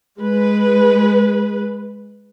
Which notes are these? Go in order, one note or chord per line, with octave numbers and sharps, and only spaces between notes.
G#3 B4